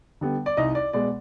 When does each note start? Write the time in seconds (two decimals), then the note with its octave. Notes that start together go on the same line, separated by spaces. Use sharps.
0.21 D3 G3 B3
0.46 D5
0.57 C2 D#4 D#5
0.75 D5
0.93 B2 G#3 B3 D5